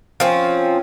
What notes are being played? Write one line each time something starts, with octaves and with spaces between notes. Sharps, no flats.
F3 C4 C#4